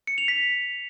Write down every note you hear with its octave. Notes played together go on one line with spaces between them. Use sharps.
C#7
F7
B6